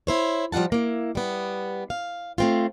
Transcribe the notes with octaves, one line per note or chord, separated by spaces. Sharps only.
E4 C5 C#5
F3 G3 F4 F#5 A5
A#3 E4
G3 B3
F5
A3 C4 F4